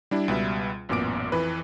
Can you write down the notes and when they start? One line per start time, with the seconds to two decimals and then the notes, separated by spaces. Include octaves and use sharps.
0.11 G3 D4 E4
0.28 C#2 B2 G3 B4 E5
0.89 A1 F#2 A#2 B3 D6 D7
1.32 F2 E3 B4